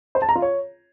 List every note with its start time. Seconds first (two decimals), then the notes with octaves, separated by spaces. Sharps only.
0.15 C5
0.22 A5
0.29 A#5
0.35 F4
0.42 C#5